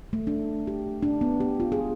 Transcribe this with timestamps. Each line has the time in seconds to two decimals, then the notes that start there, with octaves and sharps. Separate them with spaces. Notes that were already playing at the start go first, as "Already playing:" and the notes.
0.13 A3
0.27 D4
0.67 G4
1.03 D4
1.21 B3
1.40 G4
1.60 F4
1.72 G#4